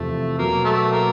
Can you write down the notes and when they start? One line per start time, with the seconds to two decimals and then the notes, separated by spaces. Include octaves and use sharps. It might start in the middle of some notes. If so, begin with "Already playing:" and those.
Already playing: E2 C3 F3 A3
0.38 B2 F#3 A#3 B3
0.64 A3
0.91 A#3